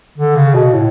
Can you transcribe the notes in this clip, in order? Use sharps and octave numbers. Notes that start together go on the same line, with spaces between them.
D3
C#3
B2
A2